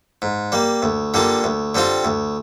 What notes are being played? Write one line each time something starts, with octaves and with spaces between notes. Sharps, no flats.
G#2
G3 A#3
D2
D3 G3 A#3 F4
D2
D3 G3 C4 F4
D2